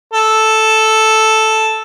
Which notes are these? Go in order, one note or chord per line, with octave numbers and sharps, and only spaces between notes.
A4